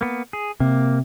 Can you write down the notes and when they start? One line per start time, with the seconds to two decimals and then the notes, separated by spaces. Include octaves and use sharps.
0.01 A#3 B3
0.33 G#4
0.60 C3 A#3